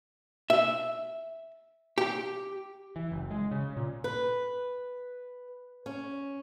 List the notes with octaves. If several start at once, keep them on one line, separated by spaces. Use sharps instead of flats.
E5
G4
E3
F#1
G#3
C#3
A#2
B4
C#4